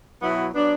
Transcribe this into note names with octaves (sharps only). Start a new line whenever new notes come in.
B2 F#3 B3 E4
F#3 B3 D4